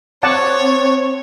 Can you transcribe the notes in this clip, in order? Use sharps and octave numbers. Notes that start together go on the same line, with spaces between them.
C4 C#5 D5 F#5 A5